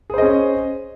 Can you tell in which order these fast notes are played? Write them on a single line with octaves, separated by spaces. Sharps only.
G#4 C5 D#5 C#4